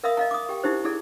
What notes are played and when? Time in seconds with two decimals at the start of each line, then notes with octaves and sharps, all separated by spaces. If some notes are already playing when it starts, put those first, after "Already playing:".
0.04 A#4 E5 F5 B5 D#6
0.17 D#5 F5 A#5
0.31 D6 D#6
0.49 G4 G5
0.64 D#4 E4 G4 C5
0.84 E4 G#4 A4 D5